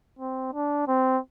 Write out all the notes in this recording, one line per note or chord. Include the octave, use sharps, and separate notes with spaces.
C4
D4
C4